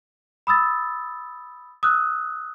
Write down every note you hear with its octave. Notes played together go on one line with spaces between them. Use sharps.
B5 D#6 E6 A6
D#6 E6 F#6